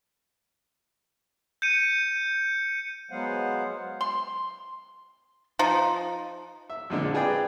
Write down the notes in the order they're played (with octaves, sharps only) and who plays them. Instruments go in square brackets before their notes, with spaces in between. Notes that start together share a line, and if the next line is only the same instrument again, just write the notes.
[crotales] G6 C#7 D#7
[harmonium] F#3 G#3 B3 C5 F5 F#5
[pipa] C6
F3 D#4
[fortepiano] E5
F2 A#2 D3 G#3 C4 D4
F4 G4 G#4 B4 D5 G5